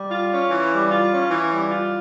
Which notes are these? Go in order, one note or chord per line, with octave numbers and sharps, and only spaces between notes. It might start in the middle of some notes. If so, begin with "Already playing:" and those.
Already playing: G3
F4
C#4
E3
G3
F4
C#4
E3
G3
F4